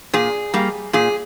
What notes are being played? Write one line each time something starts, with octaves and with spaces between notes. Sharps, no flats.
A#2 G#4
G3 A#3
A#2 G#4